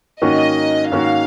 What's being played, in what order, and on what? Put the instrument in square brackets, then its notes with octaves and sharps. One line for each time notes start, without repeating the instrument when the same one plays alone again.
[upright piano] G#2 D#3 A#3 C#4 F#4 [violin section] D#5
[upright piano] G#2 D#3 A#3 C#4 F#4 [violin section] F5